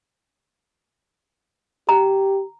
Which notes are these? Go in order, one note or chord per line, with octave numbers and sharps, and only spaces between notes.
G4 A#5